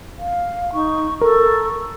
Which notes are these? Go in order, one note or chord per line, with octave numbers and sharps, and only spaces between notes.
F5
D#4 C#6
A4 A#4 C#6